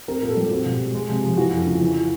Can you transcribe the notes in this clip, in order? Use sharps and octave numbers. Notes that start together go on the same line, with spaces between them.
C4 A#4
A#4
A#2
A4
G3 G4
C4 F#4
B2
G#3
G#3
C3
F3
E3 F#4
F2
C#3
E3